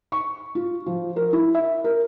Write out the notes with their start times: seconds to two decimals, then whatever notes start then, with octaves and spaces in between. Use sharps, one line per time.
0.12 C#6
0.55 F4
0.86 F3
1.16 A#4
1.33 E4
1.54 E5
1.84 A#4